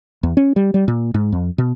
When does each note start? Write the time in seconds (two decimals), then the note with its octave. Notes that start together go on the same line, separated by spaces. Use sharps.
0.23 E2
0.37 C#4
0.56 G3
0.74 G3
0.88 A#2
1.14 G#2
1.32 F2
1.58 B2